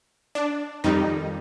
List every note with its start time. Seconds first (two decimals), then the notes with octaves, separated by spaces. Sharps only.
0.35 D4
0.84 F2 D#3 G3 D#4